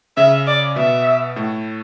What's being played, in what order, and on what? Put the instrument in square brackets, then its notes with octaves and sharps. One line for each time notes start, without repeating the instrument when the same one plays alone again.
[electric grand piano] C#3 C#4 [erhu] E5
[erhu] D5
[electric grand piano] B2 B3 [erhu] E5
[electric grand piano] A2 A3